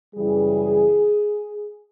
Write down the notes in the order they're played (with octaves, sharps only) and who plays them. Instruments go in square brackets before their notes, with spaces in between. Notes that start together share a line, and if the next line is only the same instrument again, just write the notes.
[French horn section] F#2 C#3 E3 G3 G#4